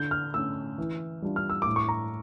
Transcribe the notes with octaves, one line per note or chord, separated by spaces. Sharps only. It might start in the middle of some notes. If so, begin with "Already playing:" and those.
Already playing: D3 G6
F6
A3 C#4 E6
E3
G3 D4 F4
F6
E6
A2 D6
C#6
A#5